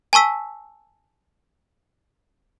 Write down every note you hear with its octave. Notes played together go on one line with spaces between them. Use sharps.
G#5 A5 C#6 E6 B6